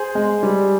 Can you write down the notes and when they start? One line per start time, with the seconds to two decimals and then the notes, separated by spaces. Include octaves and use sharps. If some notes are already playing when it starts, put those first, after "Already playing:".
Already playing: G#4 C5
0.15 G#3
0.43 G3